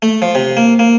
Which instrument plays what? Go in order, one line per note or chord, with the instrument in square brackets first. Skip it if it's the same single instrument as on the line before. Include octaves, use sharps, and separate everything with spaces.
[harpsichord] A3
F3
C3
A#3
A#3